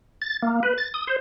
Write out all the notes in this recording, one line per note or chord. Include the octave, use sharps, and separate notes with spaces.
A6
A#3
B4
A6
D#6
C5